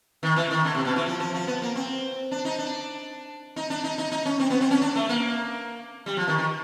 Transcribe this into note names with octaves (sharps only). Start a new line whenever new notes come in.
D#3
E3
D#3
D3
C3
B2
E3
F3
F3
F3
B3
A#3
C4
D4
D#4
D4
D#4
D4
D#4
D#4
D#4
C#4
C4
B3
C4
C#4
D4
A3
A#3
G3
F3
D#3
D#3